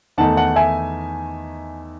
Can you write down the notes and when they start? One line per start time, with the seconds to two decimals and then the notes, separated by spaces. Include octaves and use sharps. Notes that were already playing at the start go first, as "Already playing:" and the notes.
0.18 E2 D#3 A3 D#4 F#5 A5
0.36 F#5 A5
0.56 E5 G#5